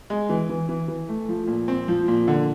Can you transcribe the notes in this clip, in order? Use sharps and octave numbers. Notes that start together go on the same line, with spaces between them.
G#3
E3
E3
E3
E3
A3
F3
A#2
C4
F3
A#2
D3